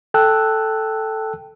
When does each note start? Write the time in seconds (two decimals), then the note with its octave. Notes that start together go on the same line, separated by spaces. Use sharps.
0.14 A4 G5 A5 E6 F#6